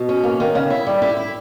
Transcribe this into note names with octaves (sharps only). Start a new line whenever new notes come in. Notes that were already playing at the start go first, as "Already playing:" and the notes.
Already playing: B2
C#4
A#3
D#3
C#3
E4
G3
E4
E4